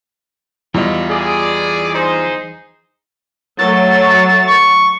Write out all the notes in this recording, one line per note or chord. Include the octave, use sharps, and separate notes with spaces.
E2 E3 G3 F4 D#5 A#5
G#4 D5
D#4 G#4 C5
F#3 A3 A6
C#6